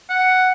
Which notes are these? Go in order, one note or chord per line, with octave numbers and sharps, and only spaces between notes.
F#5